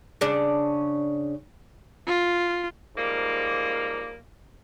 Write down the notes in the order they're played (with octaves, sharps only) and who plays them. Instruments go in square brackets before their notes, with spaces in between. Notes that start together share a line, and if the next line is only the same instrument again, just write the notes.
[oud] C#3 D4
[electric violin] F4
[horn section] G#2 F3 G3 A#3